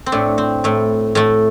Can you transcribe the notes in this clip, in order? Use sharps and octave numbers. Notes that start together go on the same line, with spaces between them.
C4
A2 A3 D4
C4
A2 A3
A2 A3